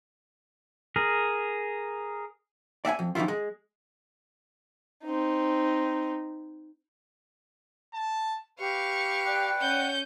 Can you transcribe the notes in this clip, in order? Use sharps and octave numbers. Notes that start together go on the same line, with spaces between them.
G#4 A#4
D5 E5 F#5 G#5
F2
F2 G#2 D#3 E4 F4
G#3
C4 D#4
A5
G4 B4 F5 C#6
D5 G5 F#6
C#4 F#5 G6